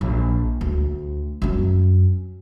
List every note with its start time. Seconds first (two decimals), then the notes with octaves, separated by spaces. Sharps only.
0.01 A#1
0.61 D2
1.42 F#2 C#4